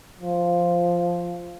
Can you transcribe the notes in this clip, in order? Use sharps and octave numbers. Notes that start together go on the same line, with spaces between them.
F3